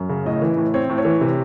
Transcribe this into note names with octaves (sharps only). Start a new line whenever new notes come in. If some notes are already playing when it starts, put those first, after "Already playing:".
Already playing: F#2
C#3
A2 D#5
E3
A2
C4 C#5
A2
C#5
E3
C3